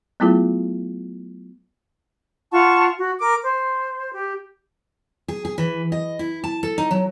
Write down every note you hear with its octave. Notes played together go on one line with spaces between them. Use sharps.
F#3 A3 B3 E4 F4 G#4
F4 F#5 A5 C#6
F#4
A#4 D6
C5
G4
G#4
G#4
E3
D#5
E4
A5
A4
D#4
F#3